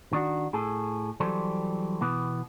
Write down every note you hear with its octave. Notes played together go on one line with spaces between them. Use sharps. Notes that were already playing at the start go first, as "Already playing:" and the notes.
D#3 D4 F#4
A2 G#4 A4
E3 F#3 G3 A4 C5
B2 E3 B3